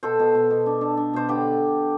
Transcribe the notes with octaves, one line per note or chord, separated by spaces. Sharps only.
B2 A4 C5
B2
B2
B2
D4
D4
D4
B2 C5
D3 G4 B4